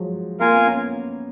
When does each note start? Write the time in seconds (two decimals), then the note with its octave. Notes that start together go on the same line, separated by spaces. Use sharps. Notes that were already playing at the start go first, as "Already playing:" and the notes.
Already playing: F3 F#3 G#3
0.40 A#3 F4 A#4 F5 G#5
0.53 B3
0.66 C#4